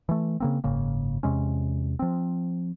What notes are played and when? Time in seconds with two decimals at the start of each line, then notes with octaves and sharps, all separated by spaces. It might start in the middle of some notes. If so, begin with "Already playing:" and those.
0.09 E3 A3
0.40 C#3 A#3 C4
0.64 F#1 G#2 C#3 A#3
1.23 E2 C3 G#3 C#4
1.99 F3 C4